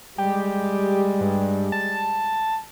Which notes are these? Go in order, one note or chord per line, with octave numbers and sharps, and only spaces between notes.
G3 G#3 G4
G2
A5